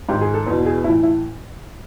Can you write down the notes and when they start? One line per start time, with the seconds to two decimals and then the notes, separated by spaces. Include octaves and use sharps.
0.09 G#2 G4
0.12 D#3
0.21 G#4
0.34 A4
0.46 E2 B2
0.66 G#4
0.84 A2 E4
0.89 E3
1.03 E4